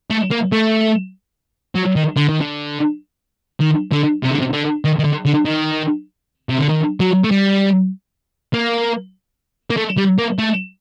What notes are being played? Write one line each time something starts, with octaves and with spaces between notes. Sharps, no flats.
A3
A#3
A3
F#3
D#3
D3
D#3
D3
D#3
D3
C3
D3
C3
D3
D#3
D#3
D3
D3
D#3
C3
D3
D#3
F#3
A3
G3
A#3
A#3
A3
G3
A#3
A3